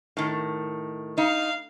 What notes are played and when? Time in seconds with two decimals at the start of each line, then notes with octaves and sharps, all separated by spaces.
0.17 A2 D#3
1.18 D#4 F5